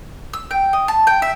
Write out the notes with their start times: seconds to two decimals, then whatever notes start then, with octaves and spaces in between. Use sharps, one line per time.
0.33 E6
0.51 G5
0.73 D#5
0.88 A5
1.07 G5
1.22 E5